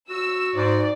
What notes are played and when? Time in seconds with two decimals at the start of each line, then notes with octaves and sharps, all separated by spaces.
0.10 F#4 E6
0.56 G#2 D5